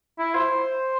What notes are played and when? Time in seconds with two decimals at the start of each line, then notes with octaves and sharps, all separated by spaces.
0.19 E4
0.35 C5